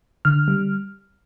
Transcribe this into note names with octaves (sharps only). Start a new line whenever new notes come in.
D3 F6
G3